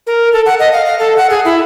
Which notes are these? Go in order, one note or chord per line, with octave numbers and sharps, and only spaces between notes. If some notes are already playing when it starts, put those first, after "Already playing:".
A#4
A4
F#5
D#5
F5
F5
A4
F#5
G#4
E4